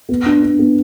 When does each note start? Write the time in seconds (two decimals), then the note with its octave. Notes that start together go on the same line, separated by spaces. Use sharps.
0.09 B3
0.26 D4
0.43 D4
0.59 B3